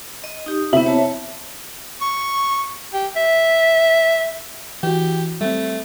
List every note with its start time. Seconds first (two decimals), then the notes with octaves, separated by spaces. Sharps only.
0.24 D#5
0.46 D#4 G4 D#6
0.73 C3 B3 E4 E5 F#7
0.86 C#5 A5
2.01 C#6
2.93 G4
3.16 E5
4.83 E3 F#4 G4
5.41 G3 A3 C4